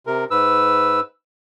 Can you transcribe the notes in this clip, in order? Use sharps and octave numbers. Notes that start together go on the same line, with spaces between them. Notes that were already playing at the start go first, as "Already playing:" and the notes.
C3 A#4
G#2 B4 E6